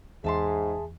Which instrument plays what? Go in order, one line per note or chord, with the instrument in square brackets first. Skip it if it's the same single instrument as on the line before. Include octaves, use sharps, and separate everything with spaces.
[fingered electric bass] E2 [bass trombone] G#2 [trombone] G#4 [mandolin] E5 A5 C6